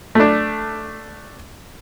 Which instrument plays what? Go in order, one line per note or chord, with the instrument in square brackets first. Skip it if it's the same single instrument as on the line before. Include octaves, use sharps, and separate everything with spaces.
[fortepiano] A3 D4